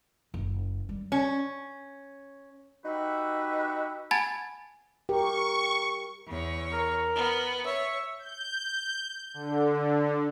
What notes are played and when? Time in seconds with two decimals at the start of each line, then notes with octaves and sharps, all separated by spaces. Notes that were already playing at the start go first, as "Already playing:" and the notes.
0.34 F#1
0.89 G3
1.12 C#4
2.85 D#4 F#4 G4 B4 E5
4.11 F#5 G#5 A5 B5 G#6 A6
5.09 G4 A#4 C#6
6.27 E2 C#5
6.73 A#4
7.14 B3
7.65 C#5 E5
8.19 G6
9.34 D3